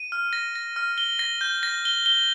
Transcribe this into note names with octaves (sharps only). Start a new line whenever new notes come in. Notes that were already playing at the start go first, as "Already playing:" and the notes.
Already playing: D#7
F6
A#6
A#6
F6
G7
A#6
G6
A#6
G7
G7